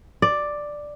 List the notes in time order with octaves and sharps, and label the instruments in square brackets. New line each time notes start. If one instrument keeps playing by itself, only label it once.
[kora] D5